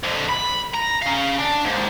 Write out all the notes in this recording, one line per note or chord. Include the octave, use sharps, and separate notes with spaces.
F2 D3
B5
A#5
C#4 F5
D4
D#2 G#2